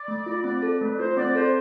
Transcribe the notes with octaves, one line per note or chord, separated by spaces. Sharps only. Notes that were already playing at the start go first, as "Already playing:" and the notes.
Already playing: D5
A3
F4
C4
A4
A3 B4
F4 C5
C4 D5
A4 C5